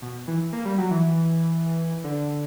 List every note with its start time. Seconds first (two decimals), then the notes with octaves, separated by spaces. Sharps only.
0.02 B2
0.27 E3
0.53 A#3
0.65 G3
0.78 F#3
0.91 E3
2.04 D3